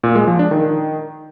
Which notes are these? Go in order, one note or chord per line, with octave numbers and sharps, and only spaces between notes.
A#2
G#3
F3
D4
D#3